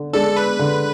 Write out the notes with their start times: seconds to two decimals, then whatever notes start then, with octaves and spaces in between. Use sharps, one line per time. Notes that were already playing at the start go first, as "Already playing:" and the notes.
Already playing: D3
0.13 G#3 D4 A4
0.37 B4
0.59 D3